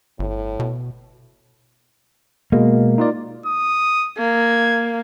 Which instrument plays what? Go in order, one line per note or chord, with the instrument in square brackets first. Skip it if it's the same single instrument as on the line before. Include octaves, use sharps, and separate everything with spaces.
[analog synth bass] G1 [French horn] A2
[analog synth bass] B2
[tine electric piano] B2 G#3 [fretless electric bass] A#3
[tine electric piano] D#4 F4 D5
[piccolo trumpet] D#6
[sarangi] A#3 [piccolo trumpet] G#6